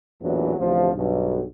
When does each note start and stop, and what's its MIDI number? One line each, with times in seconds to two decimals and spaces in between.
0.22 0.53 33
0.22 0.53 40
0.22 0.53 46
0.22 0.53 52
0.22 0.53 54
0.22 0.53 62
0.58 0.94 33
0.58 0.94 38
0.58 0.94 48
0.58 0.94 53
0.95 1.43 35
0.95 1.43 43